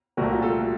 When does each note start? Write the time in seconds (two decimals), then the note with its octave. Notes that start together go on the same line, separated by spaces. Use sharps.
0.17 C2 A#2 A3 F#4 A#4
0.32 F#4
0.42 F4 A4